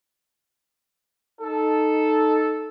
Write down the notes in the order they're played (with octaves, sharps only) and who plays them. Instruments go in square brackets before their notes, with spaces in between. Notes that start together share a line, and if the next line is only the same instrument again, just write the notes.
[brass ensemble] D#4 A4